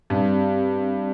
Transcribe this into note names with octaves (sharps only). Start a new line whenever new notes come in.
G2 C4 G4 D5